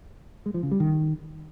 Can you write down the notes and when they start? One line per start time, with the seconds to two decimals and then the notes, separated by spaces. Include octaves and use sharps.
0.46 G#3
0.54 F3
0.63 C#3
0.71 G3
0.80 D#3